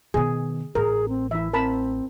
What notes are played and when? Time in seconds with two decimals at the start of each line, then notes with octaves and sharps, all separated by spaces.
0.14 B2 D#3 G#4
0.75 A1 G#4 A#4
1.09 C4
1.31 E3 E4 E5
1.53 C4 A#4 A5 B5